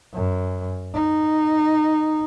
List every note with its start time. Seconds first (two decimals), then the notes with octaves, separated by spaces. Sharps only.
0.14 F#2
0.95 D#4